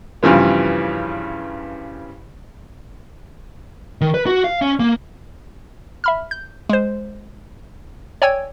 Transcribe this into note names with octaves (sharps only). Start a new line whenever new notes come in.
G2 C#3 E3 F3 B3
D#3
B4
F#4
F5
C#4
A#3
E5 B5 F6
G6
G#3 C5
C#5 D5 G5 G#5 E6 G#6